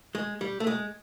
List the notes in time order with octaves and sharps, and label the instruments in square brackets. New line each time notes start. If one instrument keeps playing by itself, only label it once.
[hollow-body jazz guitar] G#3
G3
A3
G#3